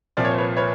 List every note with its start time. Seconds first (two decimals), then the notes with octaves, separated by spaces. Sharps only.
0.17 C2 A#2 F3 D5
0.25 C#5
0.30 C5
0.38 B4 C#5
0.57 B4 C#5